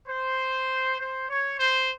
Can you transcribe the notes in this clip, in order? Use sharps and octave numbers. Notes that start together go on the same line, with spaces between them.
C5
C5
C#5
C5